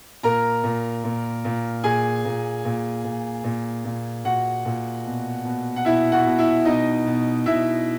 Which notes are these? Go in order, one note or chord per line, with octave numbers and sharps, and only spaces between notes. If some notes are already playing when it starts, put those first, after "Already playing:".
A#2 A#4 A#5
A#2
A#2
A#2
A#2 G#4 G#5
A#2
A#2
A#2
A#2
A#2
A#2 F#4 F#5
A#2
B2
B2
F#5
B2 E4 E5
F#4 F#5
B2
E4 E5
B2 D#4 D#5
B2
B2 E4 E5